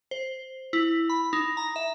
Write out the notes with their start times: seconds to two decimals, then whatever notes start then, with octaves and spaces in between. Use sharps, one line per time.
0.11 C5
0.73 E4
1.10 B5
1.33 D#4
1.57 A#5
1.76 E5